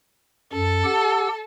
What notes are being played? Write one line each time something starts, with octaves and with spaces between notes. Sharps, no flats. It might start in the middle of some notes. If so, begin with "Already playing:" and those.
F#2 A4
G4 F#5 E6